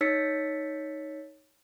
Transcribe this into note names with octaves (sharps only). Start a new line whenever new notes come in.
D#4 C#5 E6 A6 B6 C#7